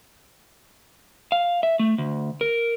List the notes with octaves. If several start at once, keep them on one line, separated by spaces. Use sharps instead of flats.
F5
E5
A3
D2
A#4